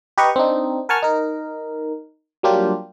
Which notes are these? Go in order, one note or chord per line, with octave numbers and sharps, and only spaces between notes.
G4 B4 D#5 A#5 C#6
C4 D4 D#4
A#4 F#5 G#5 A5 C#6 F6
D#4 A#4
F#3 G3 A#3 D4 F4 G4